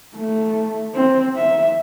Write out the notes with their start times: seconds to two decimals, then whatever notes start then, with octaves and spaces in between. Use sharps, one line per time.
0.16 A3
0.95 C4
1.36 E5